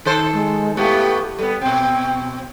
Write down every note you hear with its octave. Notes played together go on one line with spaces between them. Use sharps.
D#3 A4 C5
G#3
A2 A3 B3 G4
G3 B3 A4
B2 C4 G5